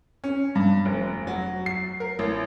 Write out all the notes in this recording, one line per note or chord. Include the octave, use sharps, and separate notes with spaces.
C#4
G2
F1
F#3
C7
A#4
A1